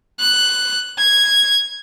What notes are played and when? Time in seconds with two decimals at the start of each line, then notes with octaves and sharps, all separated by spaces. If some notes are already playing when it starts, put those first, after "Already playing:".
0.20 F#6
0.98 G#6